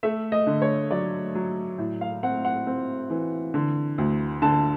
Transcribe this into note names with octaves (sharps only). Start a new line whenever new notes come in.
A3 E5
D#5
D3
C#5
F#3 D5
F#3
A2
F5
C4 F#5
F#5
C4
E3
D3
D2
D3 A5